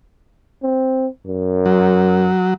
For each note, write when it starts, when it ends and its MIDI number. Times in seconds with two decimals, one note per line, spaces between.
0.63 1.07 60
1.27 2.30 42
1.66 2.54 54